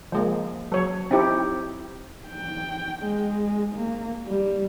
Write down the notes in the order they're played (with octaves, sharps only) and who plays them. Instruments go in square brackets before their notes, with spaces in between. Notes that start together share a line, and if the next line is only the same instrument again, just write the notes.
[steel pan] F3 G#3 A#3
F#3 C#5
C4 D#4 E4 G4
[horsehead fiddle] G5
G#3
A#3
G3